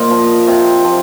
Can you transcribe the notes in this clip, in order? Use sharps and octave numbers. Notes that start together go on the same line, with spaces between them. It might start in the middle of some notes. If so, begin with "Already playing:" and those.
Already playing: A#2 C5 D#5
F3
C3
F3